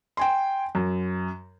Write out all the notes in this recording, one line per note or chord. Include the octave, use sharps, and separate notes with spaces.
G5 G#5 C6
F#2